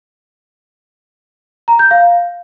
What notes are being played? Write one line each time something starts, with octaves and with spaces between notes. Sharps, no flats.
A#5
G6
F5